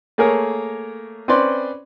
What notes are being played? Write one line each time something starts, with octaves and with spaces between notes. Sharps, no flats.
A3 A#3 G#4 A#4 C#5
C4 C#4 B4 C5 D5 C6